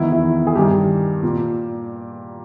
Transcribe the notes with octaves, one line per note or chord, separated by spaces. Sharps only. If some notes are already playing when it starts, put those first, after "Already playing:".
Already playing: E2 D#3 E4
E4
G#4
G2 D#3 G4
A#2